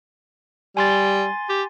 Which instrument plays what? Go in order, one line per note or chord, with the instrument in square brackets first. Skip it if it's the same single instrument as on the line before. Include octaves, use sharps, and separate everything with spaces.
[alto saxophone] G3 [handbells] G#5 C6 A6
[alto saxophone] G4